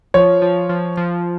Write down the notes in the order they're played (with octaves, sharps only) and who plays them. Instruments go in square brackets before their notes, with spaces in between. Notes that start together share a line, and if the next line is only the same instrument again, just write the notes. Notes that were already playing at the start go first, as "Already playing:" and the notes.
[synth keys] F3 [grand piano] C#5
[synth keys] F3
F3
F3